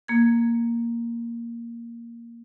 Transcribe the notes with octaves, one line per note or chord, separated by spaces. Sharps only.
A#3 G#6